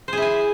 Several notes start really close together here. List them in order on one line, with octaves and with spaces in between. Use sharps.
C5 G#4 E4 G#5